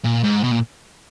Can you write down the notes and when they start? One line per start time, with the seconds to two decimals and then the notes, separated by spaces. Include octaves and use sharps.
0.05 A#2
0.24 G#2
0.44 B2
0.51 A#2